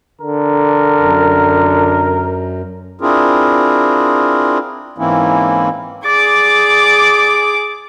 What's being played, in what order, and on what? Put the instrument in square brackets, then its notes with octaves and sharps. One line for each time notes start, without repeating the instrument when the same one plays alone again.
[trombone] D3 [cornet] A#4
[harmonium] F#2
C4 D4 E4 F4 G#4 A#4
G#2 E3 A#3 C4 C#4 E4
[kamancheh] G#4 D6 [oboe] D5